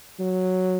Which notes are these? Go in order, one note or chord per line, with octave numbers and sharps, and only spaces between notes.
F#3